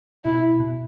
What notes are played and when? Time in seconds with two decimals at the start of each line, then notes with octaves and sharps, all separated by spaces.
0.24 B2 E4
0.60 B2